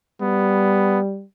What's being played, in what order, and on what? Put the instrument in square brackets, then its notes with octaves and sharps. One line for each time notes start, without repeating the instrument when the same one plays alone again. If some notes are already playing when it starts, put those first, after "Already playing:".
[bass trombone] G3 [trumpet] B3